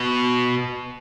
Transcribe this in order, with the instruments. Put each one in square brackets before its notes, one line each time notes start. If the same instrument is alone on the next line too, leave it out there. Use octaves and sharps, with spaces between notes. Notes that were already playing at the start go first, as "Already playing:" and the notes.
Already playing: [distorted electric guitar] B2